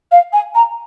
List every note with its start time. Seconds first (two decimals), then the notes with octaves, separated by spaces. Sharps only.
0.12 F5
0.33 G#5
0.55 A#5